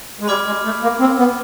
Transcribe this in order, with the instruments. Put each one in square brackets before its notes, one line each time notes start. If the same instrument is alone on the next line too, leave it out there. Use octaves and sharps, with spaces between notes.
[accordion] G#3
[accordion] G3 [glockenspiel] B5 D6 F6 G#6
[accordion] G#3
A3
A#3
C4
B3